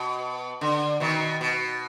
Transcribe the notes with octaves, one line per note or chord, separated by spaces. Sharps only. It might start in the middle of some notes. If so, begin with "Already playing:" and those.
Already playing: B2
D3
B2 D#3
B2